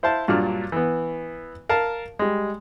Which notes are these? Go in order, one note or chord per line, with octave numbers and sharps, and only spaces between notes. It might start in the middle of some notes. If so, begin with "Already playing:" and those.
E4 C5 F5 A5
G2 A#2 F#3 D4 F6
E3 B3
A#4 F5 A5
G3 G#3